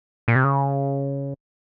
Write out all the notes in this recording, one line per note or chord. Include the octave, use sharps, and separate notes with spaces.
A#2
C3
C#3